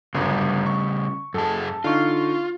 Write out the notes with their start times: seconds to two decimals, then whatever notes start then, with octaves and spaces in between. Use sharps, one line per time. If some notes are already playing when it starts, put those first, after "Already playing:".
0.15 G1 F#2 C#3 G3
0.66 C#6
1.34 F#2 G#4 A4 A5
1.84 D3 D#4 F4 C#6